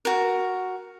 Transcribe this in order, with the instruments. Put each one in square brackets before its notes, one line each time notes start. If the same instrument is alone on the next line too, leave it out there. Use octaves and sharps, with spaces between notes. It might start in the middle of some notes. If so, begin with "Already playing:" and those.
[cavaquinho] F#4 A#4